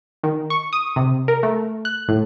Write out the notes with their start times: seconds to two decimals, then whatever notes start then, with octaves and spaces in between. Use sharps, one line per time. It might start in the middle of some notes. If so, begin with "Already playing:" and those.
0.24 D#3
0.50 C#6
0.73 D#6
0.96 C3
1.28 A#4
1.43 A3
1.85 F#6
2.08 A2